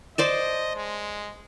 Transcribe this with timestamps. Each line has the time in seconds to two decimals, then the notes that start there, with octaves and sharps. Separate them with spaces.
0.18 C5 D5 D#5 A5
0.76 G#3